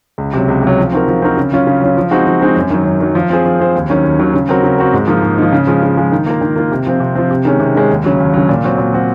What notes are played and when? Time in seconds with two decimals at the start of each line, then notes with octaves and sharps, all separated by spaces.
0.18 C#2
0.33 C3 F#3
0.48 C#2
0.62 C3 F#3
0.79 F3
0.92 C4 D#4 F#4 A#4
1.08 F3
1.22 C4 D#4 F#4 A#4
1.37 C#3
1.52 F#3 C#4 F4
1.67 C#3
1.81 F#3 C#4 F4
1.97 F3
2.11 G#3 C4 D#4 F#4
2.27 F3
2.41 G#3 C4 D#4 F#4
2.56 F#2
2.70 D#3 F#3
2.85 F#2
3.00 D#3 F#3
3.15 F3
3.30 C4 F4 G#4 C5
3.45 F3
3.60 C4 F4 G#4 C5
3.75 D#2
3.90 D#3 F#3 C#4
4.04 D#2
4.19 D#3 F#3 C#4
4.34 C#3
4.49 F#3 C4 F#4 A#4
4.63 C#3
4.78 F#3 C4 F#4 A#4
4.93 G#2
5.07 F3 A#3 D#4
5.22 G#2
5.38 F3 A#3 D#4
5.52 C#3
5.67 F3 G#3
5.83 C#3
5.97 F3 G#3
6.12 D#3
6.26 A#3 F4 A#4
6.41 D#3
6.56 A#3 F4 A#4
6.72 C3
6.86 F3 C4
7.00 C3
7.15 F3 C4
7.31 C3
7.45 D#3 G#3 C#4
7.60 C3
7.75 D#3 G#3 C#4
7.90 D#2
8.04 C#3 F#3
8.20 D#2
8.34 C#3 F#3
8.49 A#2
8.64 F#3 C4 F#4
8.78 A#2
8.93 F#3 C4 F#4